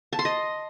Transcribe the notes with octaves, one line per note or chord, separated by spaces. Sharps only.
A5
C6
D#5